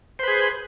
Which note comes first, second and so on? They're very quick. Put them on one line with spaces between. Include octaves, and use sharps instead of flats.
C5 B4 G#4